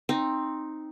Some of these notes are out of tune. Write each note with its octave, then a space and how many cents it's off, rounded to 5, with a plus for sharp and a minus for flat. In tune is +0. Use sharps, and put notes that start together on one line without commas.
C4 +10 D#4 +0